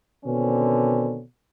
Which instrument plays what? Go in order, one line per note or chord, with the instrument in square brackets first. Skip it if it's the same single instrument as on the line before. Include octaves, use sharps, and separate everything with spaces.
[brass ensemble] B2 D3 D#3 C4 C#4